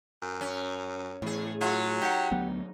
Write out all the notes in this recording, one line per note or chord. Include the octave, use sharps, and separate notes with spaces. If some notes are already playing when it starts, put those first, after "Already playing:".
F#2
C#4
E2 A2 G#4
F#3 F4 G#4 E5 F#5
D#4 G4 F#5
D2 F#3 B3